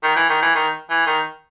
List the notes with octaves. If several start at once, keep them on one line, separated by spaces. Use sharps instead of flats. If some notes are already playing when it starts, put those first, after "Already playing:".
D#3
E3
D#3
E3
D#3
E3
D#3